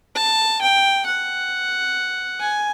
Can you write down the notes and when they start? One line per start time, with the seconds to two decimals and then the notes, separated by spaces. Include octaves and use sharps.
0.16 A5
0.61 G5
1.06 F#5
2.40 G#5